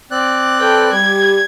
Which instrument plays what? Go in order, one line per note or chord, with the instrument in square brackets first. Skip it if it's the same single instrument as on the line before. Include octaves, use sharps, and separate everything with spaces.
[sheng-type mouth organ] C4 D5 F#6
[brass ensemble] A4 B4 [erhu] G5
[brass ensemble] G3 [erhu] G#6